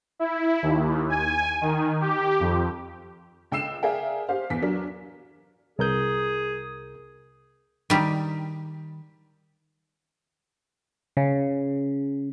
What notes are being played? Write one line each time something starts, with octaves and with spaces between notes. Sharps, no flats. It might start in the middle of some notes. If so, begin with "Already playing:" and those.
E4
D#2
G#5
D#3
G4
F2
C#2 G5 E6 C7 E7
G#4 A#4 D5 E5 F5 G5
G4 C5 F5
E2 B6
F#3 D4 A#4 B6
C2 G#4 A#4 G6
D#3 G3
C#3